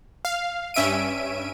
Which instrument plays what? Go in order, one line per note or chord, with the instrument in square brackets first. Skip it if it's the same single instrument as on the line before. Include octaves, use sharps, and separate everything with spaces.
[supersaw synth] F5
G2 C#4 E5 D7 D#7